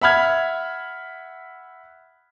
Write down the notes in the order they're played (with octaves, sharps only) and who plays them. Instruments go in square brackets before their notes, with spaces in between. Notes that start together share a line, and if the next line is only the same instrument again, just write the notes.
[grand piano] E5 F#5 B5 F6 G#6